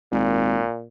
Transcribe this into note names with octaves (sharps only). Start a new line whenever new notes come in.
G#1 A#2